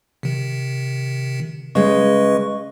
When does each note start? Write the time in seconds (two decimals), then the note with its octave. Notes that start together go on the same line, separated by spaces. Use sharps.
0.23 C3 D#3
1.75 C#3 G#3 B4 D#5 C#6